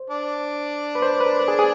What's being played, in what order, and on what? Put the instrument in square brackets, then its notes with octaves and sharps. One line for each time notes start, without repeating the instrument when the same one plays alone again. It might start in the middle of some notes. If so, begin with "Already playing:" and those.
Already playing: [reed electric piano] C5
[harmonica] D4
[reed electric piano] B4
C5
B4
A#4
G#4
G#4